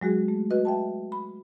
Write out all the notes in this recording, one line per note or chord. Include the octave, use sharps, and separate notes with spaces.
F#3 G#3 F#4 G#4
A3
F#4 B4 D#5
E5 G5 A5
B5